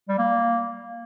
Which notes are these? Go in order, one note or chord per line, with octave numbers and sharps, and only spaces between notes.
G3
A#3